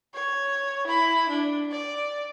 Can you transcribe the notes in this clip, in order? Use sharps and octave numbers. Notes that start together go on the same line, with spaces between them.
C#5
E4 B5
D4
D5